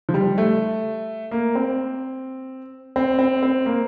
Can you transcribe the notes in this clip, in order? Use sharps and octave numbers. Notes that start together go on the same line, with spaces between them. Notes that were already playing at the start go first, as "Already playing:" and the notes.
F3
G3
A3
A#3
C4
C4
C4
C4
A#3